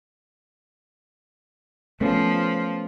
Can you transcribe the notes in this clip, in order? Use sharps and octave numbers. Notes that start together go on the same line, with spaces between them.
F3 A3 B3 C#4